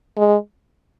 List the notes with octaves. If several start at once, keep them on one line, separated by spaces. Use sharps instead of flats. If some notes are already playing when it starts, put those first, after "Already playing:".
G#3